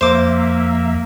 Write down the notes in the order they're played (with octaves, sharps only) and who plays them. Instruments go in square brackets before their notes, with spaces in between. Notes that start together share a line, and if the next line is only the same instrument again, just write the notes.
[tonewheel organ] F2 E5 [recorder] A#3 [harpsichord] C5 D6